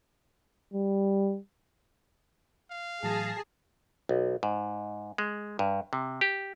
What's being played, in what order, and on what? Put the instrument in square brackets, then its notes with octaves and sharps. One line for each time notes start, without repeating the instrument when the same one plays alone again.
[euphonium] G3
[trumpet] F5
[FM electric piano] A2 E3 F#3 [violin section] G#4 [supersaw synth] A5 A#6 C7
[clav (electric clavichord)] B1
G#2
G#3
G2
C3
G4